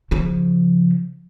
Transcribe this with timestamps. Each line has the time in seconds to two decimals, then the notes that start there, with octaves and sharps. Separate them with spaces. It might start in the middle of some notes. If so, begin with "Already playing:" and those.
0.11 C#3 F3